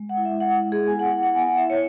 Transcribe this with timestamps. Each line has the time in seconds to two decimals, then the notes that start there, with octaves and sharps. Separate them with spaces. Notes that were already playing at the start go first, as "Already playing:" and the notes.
Already playing: G#3
0.09 F#5
0.17 E4
0.25 E5
0.40 G#3 F#5
0.64 E4
0.72 G#4
0.87 B3 G#5
0.99 F#5
1.11 E4 F#5
1.23 F#5
1.35 B3 G#5
1.46 F#5
1.58 E4 E5
1.70 C#5